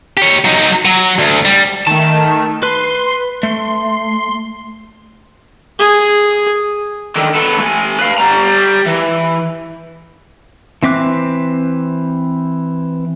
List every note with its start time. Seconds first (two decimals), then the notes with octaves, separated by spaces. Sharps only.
0.17 G4 C#5
0.45 F#3 D#4
0.85 F#3
1.18 D2
1.45 G3
1.87 D#3 A3 A5
2.63 B4 C6
3.43 A3 C6
5.79 G#4
7.16 D3 D#3
7.35 B3 A4
7.58 A3 G#5
7.99 B4 F5
8.18 G3 A#5
8.86 E3
10.83 E3 C4 E5 D6 F#6